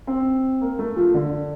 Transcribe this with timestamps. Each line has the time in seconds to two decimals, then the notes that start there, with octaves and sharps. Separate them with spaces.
0.07 C4
0.61 A#3
0.79 A3
0.96 F3
1.14 D3